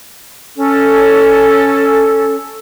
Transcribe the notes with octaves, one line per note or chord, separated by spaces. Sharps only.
C#4 A4